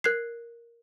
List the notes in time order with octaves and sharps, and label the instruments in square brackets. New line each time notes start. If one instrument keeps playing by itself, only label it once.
[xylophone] A#4 F#6 G#6 C7